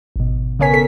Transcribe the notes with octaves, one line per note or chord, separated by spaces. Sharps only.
G#1 B2
C#3 B3 A#4 C#5 G#5 B6
A4 B6